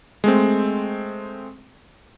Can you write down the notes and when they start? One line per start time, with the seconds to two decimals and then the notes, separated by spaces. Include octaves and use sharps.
0.24 G#3 A3 C4